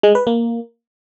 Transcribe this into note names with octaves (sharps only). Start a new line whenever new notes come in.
G#3
B4
A#3